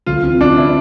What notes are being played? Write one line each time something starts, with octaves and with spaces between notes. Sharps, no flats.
D2 F4
C3 E3
D2 D4
C3 E3 E4